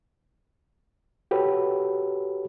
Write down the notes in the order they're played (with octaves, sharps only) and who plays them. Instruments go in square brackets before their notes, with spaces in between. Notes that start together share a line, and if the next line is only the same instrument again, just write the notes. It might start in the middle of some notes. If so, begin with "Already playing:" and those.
[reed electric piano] F#4 G4 A4 B4 C#5